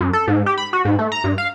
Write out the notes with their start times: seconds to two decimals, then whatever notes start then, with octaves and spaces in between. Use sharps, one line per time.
0.01 F#2
0.13 A4
0.27 G#2
0.46 G4
0.58 B5
0.73 F#4
0.85 G#2
0.99 A3
1.12 A#5
1.24 G2
1.38 F5